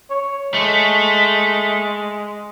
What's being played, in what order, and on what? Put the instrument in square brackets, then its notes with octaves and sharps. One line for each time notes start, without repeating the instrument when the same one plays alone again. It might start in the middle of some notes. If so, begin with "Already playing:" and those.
[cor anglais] C#5
[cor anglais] G#3 [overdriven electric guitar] A3